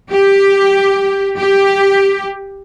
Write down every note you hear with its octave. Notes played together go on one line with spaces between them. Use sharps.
G4
G4